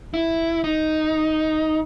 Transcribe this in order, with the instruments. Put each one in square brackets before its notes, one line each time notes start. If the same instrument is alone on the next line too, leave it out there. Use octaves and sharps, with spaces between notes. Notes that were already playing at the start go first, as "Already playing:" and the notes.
[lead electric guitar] E4
D#4